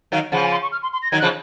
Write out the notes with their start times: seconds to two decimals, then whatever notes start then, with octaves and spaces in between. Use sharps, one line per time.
0.12 D#3 F#3 F5
0.32 C#3 F3 F#5
0.43 G#5
0.52 C6
0.62 C#6
0.72 F6
0.83 C6
0.93 C6
1.02 A#6
1.11 D#3 F#3 G#6
1.20 C#3 F3 F#6